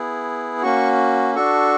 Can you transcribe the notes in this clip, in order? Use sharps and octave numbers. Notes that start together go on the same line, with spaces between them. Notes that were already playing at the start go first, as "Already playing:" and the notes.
Already playing: B3 E4 G#4
A#3 C#4 F#4 C#6
D4 F#4 A4 C#6